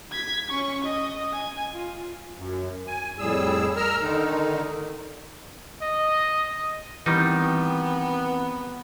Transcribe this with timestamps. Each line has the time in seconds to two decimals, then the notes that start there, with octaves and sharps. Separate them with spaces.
0.12 G#6 B6
0.50 C#4 C#6
0.85 D#5
1.33 G#5
1.74 F4
2.36 F#2
2.87 G#5
3.19 F2 A2 G3 G#4 E6
3.76 A#4 A#5 E6 F6
4.01 D3 D#3 D#4
5.82 D#5
7.06 D#3 E3 G3 B3 C4 D#4